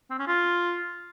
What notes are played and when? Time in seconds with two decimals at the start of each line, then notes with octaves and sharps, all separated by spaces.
0.11 C4
0.19 C#4
0.27 F4